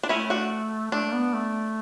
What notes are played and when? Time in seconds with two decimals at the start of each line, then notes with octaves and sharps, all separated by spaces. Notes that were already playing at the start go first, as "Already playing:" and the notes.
0.03 D4
0.09 A3 C#4 E4
0.30 D4 F#4
0.92 A3 D4
1.05 A3
1.14 B3
1.34 A3